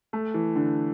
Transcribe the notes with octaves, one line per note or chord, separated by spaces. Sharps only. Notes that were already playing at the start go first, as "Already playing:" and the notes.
A3
E3
D3